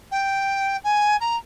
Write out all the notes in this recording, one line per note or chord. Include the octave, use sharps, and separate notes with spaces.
G5
G#5
A#5